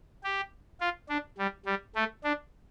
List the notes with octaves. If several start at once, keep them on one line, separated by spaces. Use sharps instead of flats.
G4
F4
D4
G3
G3
A3
D4